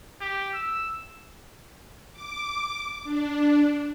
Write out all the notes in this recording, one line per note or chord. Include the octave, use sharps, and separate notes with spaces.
G4
E6
D6
D4